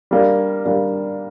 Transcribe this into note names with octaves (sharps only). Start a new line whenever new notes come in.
G3 A#3 D4
G3 A#3 D4